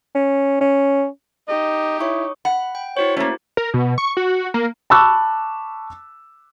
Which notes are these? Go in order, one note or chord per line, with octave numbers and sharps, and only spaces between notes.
C#4
C#4
D#4 G4 D#5
E4 C#5 C#6 D#6
F#5 B5
G5
E4 F#4 C5 C#5
A3 A#3 C#4
A#4
B2
C#6
F#4
A#3
A5 B5 C#6 D6 E6 F#6